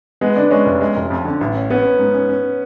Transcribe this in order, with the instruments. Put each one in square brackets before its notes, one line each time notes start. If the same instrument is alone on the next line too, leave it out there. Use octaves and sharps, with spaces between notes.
[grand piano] G#3 [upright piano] B3
[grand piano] D3 [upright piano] D4
[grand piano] G#3 [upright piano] C#4
[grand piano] F1
G#3
F1
F2
D3
A1
C#4
[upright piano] B3 [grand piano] C#4
[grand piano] C#4
G#2
C#4
C#4